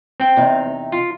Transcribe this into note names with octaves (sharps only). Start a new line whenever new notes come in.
C4 G5
E2 C3 D#4
F4